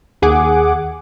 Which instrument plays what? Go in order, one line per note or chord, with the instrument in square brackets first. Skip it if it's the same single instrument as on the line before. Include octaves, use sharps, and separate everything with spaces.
[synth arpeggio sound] D#2 G#4 F#5 D6